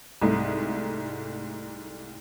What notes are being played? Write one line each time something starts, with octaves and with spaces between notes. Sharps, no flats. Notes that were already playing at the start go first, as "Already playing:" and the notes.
C2 G#2 A3